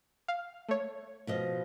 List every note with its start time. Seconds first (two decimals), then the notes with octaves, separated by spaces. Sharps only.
0.28 F5
0.69 A3 C#5
1.27 B2 F3 D#5